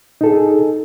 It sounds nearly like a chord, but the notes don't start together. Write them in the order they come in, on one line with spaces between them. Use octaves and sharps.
D#4 A4 G#4